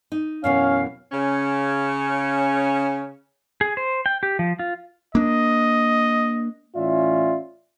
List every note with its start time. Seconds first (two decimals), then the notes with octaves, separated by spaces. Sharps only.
0.12 D#4
0.44 F#2 B2 E3 C#4 F5
1.12 C#3 C#4
3.61 G#4
3.77 C5
4.06 G5
4.23 G4
4.39 F3
4.59 F4
5.15 A#3 D4 D#5
6.76 A2 E3 C#4 F4 D5 E5